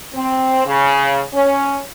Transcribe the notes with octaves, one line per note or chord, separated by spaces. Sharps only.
C4
C#3
C#4